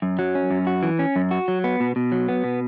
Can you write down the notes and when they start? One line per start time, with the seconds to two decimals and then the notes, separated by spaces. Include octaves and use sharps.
0.02 F#2
0.19 F#3
0.35 C#4
0.51 F#2
0.67 F#4
0.83 E3
0.99 C#4
1.16 F#2
1.31 F#4
1.48 F#3
1.64 B3
1.80 B2
1.96 B2
2.12 F#3
2.29 B3
2.44 B2